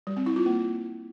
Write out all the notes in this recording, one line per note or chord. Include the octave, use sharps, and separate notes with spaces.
G3
C4
E4
F4
A#3